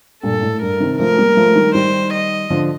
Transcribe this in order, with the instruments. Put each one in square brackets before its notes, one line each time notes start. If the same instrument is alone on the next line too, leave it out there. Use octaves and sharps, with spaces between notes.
[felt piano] G2 A#2 [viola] A4
[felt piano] A2
[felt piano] G2 [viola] A#4
[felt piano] C3 D#3
[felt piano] F3 A3 [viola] A#4
[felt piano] G3 A#3
F3 A3
D#3 G3
[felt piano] D#3 G3 [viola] C5
[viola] D#5
[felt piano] D3 F3